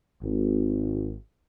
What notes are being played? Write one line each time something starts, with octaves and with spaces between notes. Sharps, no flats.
G#1